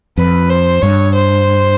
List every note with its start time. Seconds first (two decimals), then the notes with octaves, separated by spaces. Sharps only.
0.17 F2 B4
0.50 C5
0.82 G2 C#5
1.14 C5